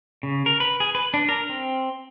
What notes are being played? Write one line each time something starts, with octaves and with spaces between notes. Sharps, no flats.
C#3
A#4
B4
G#4
B4
D4
A#4
C4